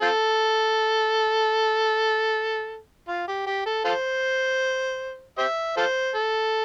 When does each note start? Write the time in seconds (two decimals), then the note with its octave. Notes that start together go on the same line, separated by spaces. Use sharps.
0.02 C4 F4 A4
3.08 F4
3.28 G4
3.47 G4
3.66 A4
3.85 F4 A4 C5
5.38 G4 C5 E5
5.77 F4 A4 C5
6.15 A4